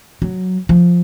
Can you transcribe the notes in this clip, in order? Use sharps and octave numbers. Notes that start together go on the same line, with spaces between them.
F#3
F3